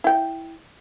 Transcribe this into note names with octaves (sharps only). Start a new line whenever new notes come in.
E4 G5